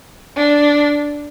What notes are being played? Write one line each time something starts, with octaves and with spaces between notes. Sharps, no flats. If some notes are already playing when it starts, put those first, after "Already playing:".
D4